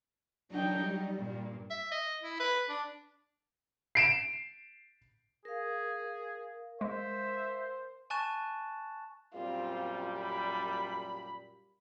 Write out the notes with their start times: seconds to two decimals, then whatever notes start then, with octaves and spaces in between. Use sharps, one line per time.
0.52 F#3 D4 D#4 G5
0.82 G3
1.17 G2 A#2 A#3
1.70 E5
1.91 D#5
2.23 E4
2.40 B4
2.69 D4
3.95 C7 D7 E7
5.45 G#4 A#4 F5
6.81 G#3 C5 E5
8.10 G#5 A5 C#6 F#6 A6 E7
9.34 F#2 A#2 G3 C4 F4
10.20 B5